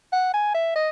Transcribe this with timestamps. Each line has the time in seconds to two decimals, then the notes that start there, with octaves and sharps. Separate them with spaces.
0.12 F#5
0.34 G#5
0.54 E5
0.75 D#5